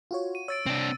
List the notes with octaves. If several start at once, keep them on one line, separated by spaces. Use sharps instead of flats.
F4 F#4 C#5
D#7
C#5 E6 A6 D7
C3 C4 D4